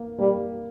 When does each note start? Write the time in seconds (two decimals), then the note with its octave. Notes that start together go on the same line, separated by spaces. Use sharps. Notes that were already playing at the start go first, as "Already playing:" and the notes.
Already playing: A#3
0.18 G3 A#3